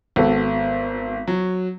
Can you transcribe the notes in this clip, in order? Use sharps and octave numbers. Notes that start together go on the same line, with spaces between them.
G#1 B3 F#4 A4
F#3